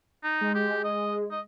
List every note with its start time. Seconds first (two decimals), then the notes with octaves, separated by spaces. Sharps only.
0.23 D#4
0.41 G#3
0.55 G4
0.84 D#5
1.31 D#5